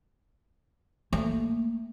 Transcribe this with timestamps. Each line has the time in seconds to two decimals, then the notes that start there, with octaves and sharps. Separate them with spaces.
1.13 A3 A#3